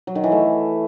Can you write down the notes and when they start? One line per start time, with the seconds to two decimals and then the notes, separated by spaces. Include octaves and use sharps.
0.07 F#3
0.15 D#3
0.24 E3
0.32 A3